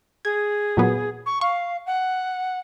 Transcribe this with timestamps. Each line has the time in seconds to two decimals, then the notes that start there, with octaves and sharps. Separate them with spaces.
0.25 G#4 G#6
0.77 A#2 F#3 B3
1.26 C#6
1.41 F5 C#6
1.86 F#5